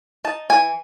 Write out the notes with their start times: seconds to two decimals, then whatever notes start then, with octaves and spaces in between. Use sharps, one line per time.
0.24 D#4 A5
0.50 E3 G#5